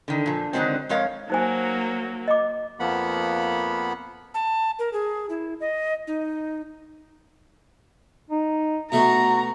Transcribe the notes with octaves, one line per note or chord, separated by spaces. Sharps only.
D3 D#3
A#2 F3
D3 D#3 F3 F#3 G#3 C4
F2 G#3 A#4 C#5 F5
F#3 A#3 D#4 C5 G#5
D#5 D6
F2 F3 A#3 B3 F#5 B5
A5
A#4
G#4
E4
D#5
D#4
D#4
B2 A3 F#4 A#5